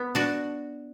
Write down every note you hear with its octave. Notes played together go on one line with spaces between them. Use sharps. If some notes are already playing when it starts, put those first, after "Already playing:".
Already playing: B3
D4 F#4